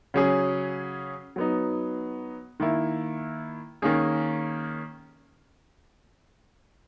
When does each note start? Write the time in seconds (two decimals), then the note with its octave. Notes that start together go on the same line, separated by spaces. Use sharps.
0.14 C#3 F#3 C#4 G#4
1.36 F#3 B3 D#4
2.60 D#3 A#3 E4
3.82 D#3 A#3 C#4 G#4